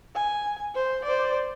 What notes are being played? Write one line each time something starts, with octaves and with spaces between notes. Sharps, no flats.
G#5
C5
C5 D5